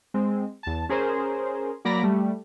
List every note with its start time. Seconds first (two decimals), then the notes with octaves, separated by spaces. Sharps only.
0.14 G#3 C4
0.63 E2 A5
0.89 C#4 G#4 A#4 C5
1.85 F#3 A#3 D5 A#5 B5 A#6
2.03 G3 A3